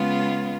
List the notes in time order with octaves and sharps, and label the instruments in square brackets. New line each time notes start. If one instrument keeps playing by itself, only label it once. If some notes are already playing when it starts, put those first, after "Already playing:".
Already playing: [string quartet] C#3 G#3 B3 F4